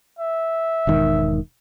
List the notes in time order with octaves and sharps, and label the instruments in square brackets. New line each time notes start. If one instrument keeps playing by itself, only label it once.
[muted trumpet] E5
[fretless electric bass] E1 G#2 D#3